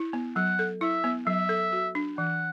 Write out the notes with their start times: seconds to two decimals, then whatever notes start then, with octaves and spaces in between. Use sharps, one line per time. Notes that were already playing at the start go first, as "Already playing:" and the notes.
Already playing: E4
0.13 B3
0.36 F#3 F#5
0.59 A4
0.81 E4 E5
1.04 B3
1.27 F#3 E5
1.49 A4
1.72 F#4
1.95 D4
2.18 E3 F#5